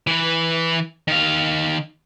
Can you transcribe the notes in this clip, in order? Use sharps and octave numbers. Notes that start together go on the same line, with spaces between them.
E3 B4
D#3 F5